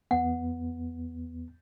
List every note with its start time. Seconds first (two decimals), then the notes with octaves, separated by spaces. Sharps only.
0.11 E2 B3 F#5